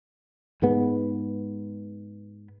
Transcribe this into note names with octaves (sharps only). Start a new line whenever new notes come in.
G#2 G#3 B3